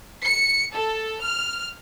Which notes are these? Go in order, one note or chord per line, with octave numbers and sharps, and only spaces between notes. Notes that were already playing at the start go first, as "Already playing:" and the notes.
C#7
A4
F6